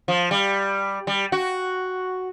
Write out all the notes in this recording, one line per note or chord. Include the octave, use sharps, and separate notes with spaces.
F3
G3
G3
F#4